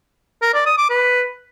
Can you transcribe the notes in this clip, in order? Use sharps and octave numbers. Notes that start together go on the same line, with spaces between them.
A#4
D5
D#6
D6
B4